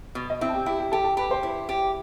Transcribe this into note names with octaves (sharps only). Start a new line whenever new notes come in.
B2
D#5
C4 E4 E5
A5
G4 G5
E4 G4 G5
G4 G5
G4 A4 A5
A4 A5
G4 B4 B5
C5 C6
E4
G4